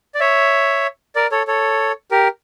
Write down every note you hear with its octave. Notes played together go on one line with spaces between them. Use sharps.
D5
C#5 E5
A#4 D5
A4 C#5
A4 C#5
G4 A#4